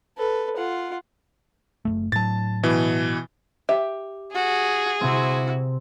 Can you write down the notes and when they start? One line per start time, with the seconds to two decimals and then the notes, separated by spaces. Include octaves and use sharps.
0.18 A4 B4
0.57 F4 F#5
1.85 F#1 E2 A3
2.12 A2 F#3 A5 A6
2.63 B2 E3
3.69 G4 E5
4.35 F#4 G#4
5.01 C3 C4 E4 F#4